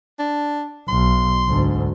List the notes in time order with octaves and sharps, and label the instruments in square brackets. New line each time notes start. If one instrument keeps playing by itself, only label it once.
[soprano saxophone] D4
[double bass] B1 [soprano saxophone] C6
[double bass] D2 G#2